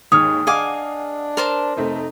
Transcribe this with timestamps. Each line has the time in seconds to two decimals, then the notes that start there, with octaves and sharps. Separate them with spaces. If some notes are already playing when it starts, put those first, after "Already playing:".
0.12 D#2 G#2 G#3 C#5 D#6 F6
0.47 D4 G#4 D#5 F5 F#5 G#5 D6
1.37 A#4 C5 A5
1.77 F1 A3 C4 D#4